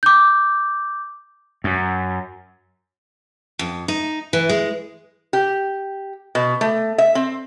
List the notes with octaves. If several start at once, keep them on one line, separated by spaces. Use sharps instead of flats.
D6 G6
F#2
F2
D#4
E3
G#3
G4
B2
A3
E5
C4